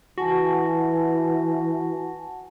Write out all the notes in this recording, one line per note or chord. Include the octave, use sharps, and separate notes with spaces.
E3 F#4 F#5 G#5 A5